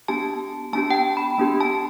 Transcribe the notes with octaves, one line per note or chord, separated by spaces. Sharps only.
B3 D4 G4 A5
B3 D4 G4 A5
G5
A5
B5
B3 D4 G4
A5